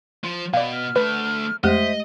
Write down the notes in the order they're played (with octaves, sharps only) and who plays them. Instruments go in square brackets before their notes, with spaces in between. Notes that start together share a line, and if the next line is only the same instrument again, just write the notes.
[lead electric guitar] F3
[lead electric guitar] B2 [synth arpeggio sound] D5 F5
[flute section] F6
[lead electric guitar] D2 A3 [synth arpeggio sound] B4
[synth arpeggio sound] F2 [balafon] G#3 A3 G4 [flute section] C5 E5 [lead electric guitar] D#5